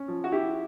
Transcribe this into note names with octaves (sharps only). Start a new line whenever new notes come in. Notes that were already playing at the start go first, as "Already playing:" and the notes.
Already playing: C#4
F3
F#4
E4 G4